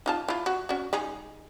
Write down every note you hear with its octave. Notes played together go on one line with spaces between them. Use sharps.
D#4 F4 A5
E4 F4
F#4
C#4 F#4
G#3 D#4 G#4